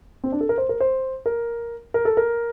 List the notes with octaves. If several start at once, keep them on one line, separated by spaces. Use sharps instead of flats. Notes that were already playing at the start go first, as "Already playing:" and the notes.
C4
D4
A4
A#4
C5
A#4
C5
A#4
A#4
A4
A#4